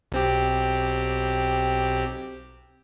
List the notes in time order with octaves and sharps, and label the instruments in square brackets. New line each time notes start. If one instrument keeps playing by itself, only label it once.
[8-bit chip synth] B1 C4 G4